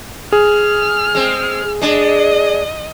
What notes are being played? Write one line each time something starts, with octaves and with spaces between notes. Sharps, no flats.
G#4 F6
G#3 C4
G#3 D4 D#5